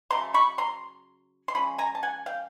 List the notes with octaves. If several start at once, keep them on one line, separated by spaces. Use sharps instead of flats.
C#3 F#3 A3 A#5 C6
B5 C#6
A#5 C6
C6
F3 G#3 C#4 B5
G#5 A#5
A5
F#5 G#5
F5 G5